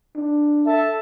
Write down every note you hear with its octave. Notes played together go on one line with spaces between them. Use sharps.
D4
A4 E5 A5